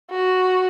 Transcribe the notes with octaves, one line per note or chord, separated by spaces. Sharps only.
F#4